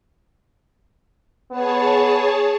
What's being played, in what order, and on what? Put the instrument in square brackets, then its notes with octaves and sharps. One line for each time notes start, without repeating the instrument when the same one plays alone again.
[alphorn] B3 [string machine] G#4 C#5 A5